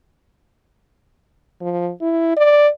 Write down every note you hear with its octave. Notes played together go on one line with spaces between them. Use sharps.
F3
E4
D5